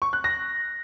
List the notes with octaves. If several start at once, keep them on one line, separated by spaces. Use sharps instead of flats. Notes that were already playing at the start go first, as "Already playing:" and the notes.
C#6
F#6
A#6